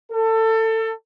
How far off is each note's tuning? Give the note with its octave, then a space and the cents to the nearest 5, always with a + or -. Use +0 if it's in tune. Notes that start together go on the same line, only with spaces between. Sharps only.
A4 +25